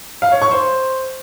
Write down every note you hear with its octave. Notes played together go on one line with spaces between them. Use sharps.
F5
C#5
C#6
C5